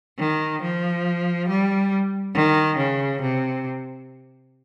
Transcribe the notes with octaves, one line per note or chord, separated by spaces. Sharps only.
D#3
F3
G3
D#3
C#3
C3